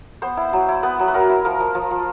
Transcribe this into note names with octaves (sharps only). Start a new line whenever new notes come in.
B3 C5
E4
F#3
E4
B3 B4
F#3
B4
F#3 A#4
E4
F3 A#4
F3
F3
F3